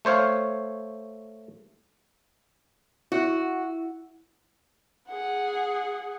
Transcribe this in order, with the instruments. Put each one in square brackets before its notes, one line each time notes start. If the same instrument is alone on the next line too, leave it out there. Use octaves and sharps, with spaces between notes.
[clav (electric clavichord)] A3 C5 C#5 F5
[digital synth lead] E4 [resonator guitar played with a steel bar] F#4
[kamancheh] G#4 F#5